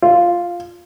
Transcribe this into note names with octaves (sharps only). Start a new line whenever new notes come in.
F4